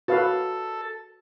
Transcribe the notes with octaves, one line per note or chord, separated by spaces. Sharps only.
F#4 A4 B4 F5